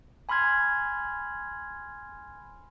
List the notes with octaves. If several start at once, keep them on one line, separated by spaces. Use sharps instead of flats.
G#5 B5 C6 F6 G#6